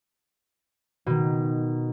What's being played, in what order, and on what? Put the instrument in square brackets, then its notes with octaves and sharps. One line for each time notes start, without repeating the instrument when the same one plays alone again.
[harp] B2 D#3